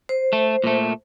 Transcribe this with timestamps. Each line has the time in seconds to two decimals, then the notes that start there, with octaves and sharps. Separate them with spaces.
0.09 C5
0.33 A3
0.64 A#2 A3